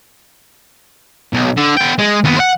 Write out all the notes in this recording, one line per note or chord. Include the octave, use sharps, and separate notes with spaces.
B1
D3
B3 G5
G#3
D#2 B3
C5 F#5